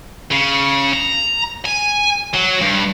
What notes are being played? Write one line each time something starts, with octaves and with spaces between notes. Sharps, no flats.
C#3
A#5
G#5
F#3
G2